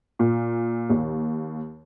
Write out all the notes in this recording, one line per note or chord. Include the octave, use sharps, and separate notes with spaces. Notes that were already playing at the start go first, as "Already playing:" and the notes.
A#2
D#2